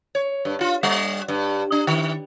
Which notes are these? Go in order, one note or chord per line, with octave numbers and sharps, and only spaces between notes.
C#5
G2
F4
G3
G2
D4
D#3